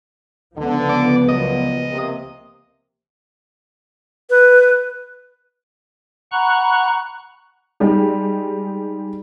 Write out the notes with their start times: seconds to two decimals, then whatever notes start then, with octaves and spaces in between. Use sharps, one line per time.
0.56 C#2 D3 F3 B3
0.89 D5
1.29 A#2 F#3 D#5
1.90 C3 A#3
4.30 B4
6.32 F#5 A#5 B5 C#6 F#6
7.80 G3 G#3 D#4